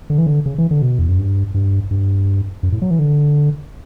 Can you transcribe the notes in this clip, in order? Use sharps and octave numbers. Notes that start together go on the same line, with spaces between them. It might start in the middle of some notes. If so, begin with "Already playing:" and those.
D3
E3
D3
C#3
E3
D3
B2
E2
F#2
G2
G2
G2
F#2
A2
F#3
E3
D3